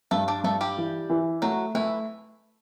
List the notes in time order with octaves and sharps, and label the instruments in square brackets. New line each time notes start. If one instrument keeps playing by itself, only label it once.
[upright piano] G2 [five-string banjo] A3 A4
[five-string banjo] D4 D5
[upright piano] G2 [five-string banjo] A3 A4
[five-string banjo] G3 G4
[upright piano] E3
E3
[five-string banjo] F#3 F#4 [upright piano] A3
[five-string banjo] E3 E4 [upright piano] A3